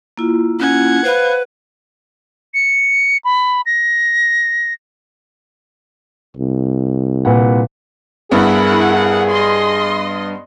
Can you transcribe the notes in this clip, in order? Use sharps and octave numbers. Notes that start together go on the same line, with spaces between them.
A#3 E4 F4
C#4 F#5 G#6
B4 C5 F5 B5
C#7
B5
A#6
C2
A#2 B4 F#5
G2 B3 E4 G#4 A#4 F#5
D#5 C6